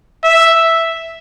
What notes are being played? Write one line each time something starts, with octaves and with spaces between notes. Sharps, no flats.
E5